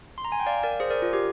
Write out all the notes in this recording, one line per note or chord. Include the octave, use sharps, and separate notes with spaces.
C6
A#5
G#5
G5
D5 F5
A#4 D5
G#4 C5
A#4 D5
F4
G4